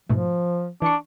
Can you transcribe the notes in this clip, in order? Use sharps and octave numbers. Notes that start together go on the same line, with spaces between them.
G#2 B2 F3 A3
E3 D4 C#6